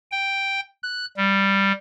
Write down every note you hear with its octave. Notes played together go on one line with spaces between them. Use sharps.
G5
F#6
G3